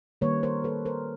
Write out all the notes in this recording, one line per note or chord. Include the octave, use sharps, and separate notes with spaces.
D#3 G3 A#3 B4 C#5
A#4 C5
A4 B4
A#4 C5